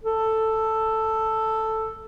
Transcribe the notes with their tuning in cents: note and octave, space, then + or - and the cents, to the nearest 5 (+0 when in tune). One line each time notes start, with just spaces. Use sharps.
A4 +5